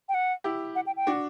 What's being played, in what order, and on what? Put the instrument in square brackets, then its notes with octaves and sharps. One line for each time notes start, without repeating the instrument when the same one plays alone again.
[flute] G5
F#5
[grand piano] E4 G4
[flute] F#5
G5
G5
[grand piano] D4 F#4